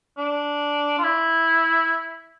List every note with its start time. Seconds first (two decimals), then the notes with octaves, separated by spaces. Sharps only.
0.18 D4
0.99 F4
1.04 E4